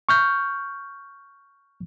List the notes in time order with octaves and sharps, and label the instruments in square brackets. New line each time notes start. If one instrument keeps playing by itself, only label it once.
[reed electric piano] C#6 F6 G6